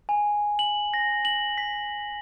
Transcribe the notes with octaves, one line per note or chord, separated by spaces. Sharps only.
G#5
F#7
A#6
F#7
B6